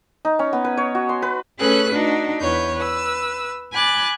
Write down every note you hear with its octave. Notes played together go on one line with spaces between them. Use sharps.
D#4
C#4
B3
B4
C#5
F#4
C6
B4
A3 C#4 G#4 A4 B4 F#6
D4 D#4 F#4
E2 B4 C#5 G6
B4 E6
G#5 B5 D6 F#6 A6